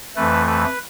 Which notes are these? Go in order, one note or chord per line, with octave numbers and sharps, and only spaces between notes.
F2 E3 A3 B4
B4